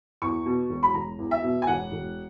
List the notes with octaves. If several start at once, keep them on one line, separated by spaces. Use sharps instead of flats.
E2 C#6
B2
E1
B5
E1 A#5
E2
E5
B2
G#5
E1 F#5
E1